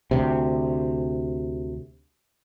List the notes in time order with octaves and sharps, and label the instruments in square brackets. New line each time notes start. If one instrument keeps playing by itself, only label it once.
[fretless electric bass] D2 C3